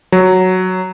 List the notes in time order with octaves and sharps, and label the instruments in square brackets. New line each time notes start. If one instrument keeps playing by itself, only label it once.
[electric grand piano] F#3